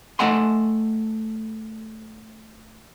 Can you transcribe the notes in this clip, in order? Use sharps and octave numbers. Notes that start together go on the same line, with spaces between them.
A3 D#5 E5 F#5 G#5 C6